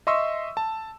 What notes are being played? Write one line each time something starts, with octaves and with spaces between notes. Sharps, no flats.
D#5 E5 C6 C#6 E6
A5